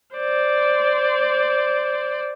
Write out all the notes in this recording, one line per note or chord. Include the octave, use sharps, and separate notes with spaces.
C5 D5